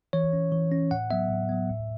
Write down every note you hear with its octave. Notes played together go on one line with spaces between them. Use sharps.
E3 C#5
C#4
E3
C#4
A2 F#5
F#3 B3 E5
A2
F#3 B3
A2